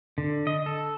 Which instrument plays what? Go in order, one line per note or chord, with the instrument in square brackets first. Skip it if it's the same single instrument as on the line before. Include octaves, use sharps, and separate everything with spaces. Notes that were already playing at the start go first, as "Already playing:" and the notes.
[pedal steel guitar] D3
D#5
A4